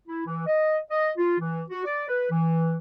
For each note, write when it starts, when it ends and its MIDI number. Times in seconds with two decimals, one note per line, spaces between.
0.07 0.22 64
0.26 0.45 52
0.46 0.78 75
0.89 1.10 75
1.17 1.39 65
1.39 1.62 52
1.70 1.85 66
1.85 2.07 74
2.08 2.29 71
2.30 2.75 52